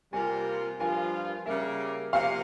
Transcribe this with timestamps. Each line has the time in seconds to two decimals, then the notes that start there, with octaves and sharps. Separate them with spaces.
0.13 C3 G3 A#3 F4 G#5
0.79 G2 F3 A#3 F4 G#5
1.46 C#3 G3 A#3 E5
2.13 C3 F3 A#3 F5